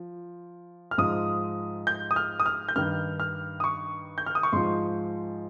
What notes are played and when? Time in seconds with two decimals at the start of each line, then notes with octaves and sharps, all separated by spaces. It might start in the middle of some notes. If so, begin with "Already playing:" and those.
Already playing: F3
0.91 F6
0.98 G#2 F3 D#6
1.87 G6
2.11 D#6
2.16 F6
2.40 D#6
2.46 F6
2.68 G6
2.76 G2 D#3 F6
3.20 F6
3.60 D#6
3.64 C#6
4.18 G6
4.26 F6
4.35 D#6
4.43 C#6
4.53 G#2 F3 C6